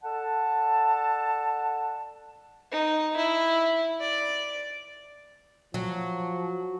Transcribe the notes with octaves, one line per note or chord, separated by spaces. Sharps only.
A4 D5 F#5 A5
D#4
E4
D5
F3 F#3